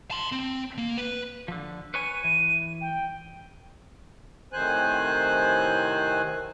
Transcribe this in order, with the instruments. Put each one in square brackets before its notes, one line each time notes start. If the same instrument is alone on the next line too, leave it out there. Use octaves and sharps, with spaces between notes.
[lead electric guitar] A5 C6
C4
A#3
B4
[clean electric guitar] D3 F3
[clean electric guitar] B4 C#5 G#5 [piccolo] D#7
[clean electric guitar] E3
[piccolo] G5
[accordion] A2 C3 D#3 C5 G#5 F#6